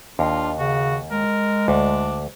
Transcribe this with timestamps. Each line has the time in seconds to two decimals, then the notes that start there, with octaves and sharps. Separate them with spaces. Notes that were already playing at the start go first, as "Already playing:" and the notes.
0.19 D#2 D4 F4
0.59 C#3 F#4
1.11 G#3 A#4
1.68 D2 D4